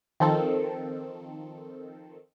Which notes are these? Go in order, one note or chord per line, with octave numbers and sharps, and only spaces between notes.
D#3 F3 C4 A4